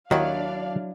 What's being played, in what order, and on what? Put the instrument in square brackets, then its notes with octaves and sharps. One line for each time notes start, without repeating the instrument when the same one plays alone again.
[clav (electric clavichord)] D#2 D#3 F#4 [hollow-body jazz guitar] F#3 E4 [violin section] D4 D5 F5